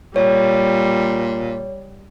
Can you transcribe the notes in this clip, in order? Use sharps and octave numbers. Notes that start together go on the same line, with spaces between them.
A#2 G3 C#5